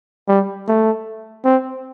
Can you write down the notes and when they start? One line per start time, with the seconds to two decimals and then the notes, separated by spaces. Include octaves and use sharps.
0.28 G3
0.68 A3
1.45 C4